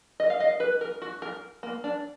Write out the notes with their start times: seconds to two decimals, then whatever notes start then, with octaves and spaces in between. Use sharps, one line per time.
0.20 D#5
0.30 F5
0.40 D#5
0.60 B4
0.81 A#4
1.02 F#4
1.22 A#4
1.63 A#3
1.84 D4